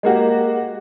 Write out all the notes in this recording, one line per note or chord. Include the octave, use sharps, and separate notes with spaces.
G#3 A#3 F#4 G4